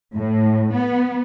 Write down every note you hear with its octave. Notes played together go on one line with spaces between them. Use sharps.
A2
B3